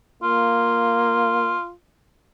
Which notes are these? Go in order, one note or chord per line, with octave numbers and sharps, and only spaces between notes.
A#3 F4